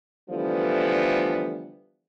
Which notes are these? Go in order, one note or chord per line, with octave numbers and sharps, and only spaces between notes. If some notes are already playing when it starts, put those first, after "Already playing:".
D3 E3 F3 G3 A3 B3